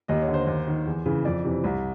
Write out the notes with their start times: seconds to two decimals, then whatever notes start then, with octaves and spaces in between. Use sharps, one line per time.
0.08 D#2 D#5
0.22 C#5
0.28 D3
0.34 C5
0.47 D#2
0.67 D#3
0.86 E2
1.05 C#3 E3
1.25 F2 D5
1.44 C3 E3
1.64 C2